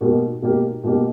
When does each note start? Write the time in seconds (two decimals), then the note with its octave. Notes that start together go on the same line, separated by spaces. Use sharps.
0.01 B2 A#3 D#4 G4 A#4
0.42 B2 A#3 D#4 G4 A#4
0.84 B2 A#3 D#4 G4 A#4